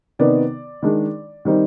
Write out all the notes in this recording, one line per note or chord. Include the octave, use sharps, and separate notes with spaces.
C3 D#3 B3 D#4 D5
D#3 G#3 D4
D#3 G3 C4 D#4